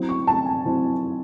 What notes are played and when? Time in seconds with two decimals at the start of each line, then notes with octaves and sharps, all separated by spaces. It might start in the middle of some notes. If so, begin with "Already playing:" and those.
Already playing: F#3 C4 E4
0.09 C#6
0.27 A5
0.46 G#5
0.66 F#3 C4 E4